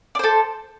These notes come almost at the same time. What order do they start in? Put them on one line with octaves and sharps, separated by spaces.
D5 C5 A4